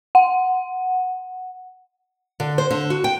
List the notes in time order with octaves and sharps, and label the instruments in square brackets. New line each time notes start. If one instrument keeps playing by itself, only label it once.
[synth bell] F#5
[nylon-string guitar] D3
C5
D3
F#4
G5